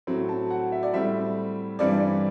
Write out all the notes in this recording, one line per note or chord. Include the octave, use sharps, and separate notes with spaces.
A2 F#3 C4
A5
F#5
E5
D5
A2 G3 C4 E5
G2 E3 G3 C4 D5